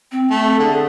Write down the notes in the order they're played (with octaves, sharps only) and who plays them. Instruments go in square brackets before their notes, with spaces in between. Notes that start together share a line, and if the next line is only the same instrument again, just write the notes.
[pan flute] C4
[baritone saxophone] A3
[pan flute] A4
[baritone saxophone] D3 [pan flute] G#4